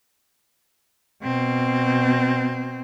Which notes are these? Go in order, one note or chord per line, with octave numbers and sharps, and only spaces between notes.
B2 C4